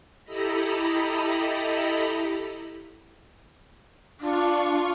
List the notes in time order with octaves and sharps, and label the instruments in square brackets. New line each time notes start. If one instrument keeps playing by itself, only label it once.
[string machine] E4 G4 A4 D#5 A#5 B5
[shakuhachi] D4 [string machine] F4 C#6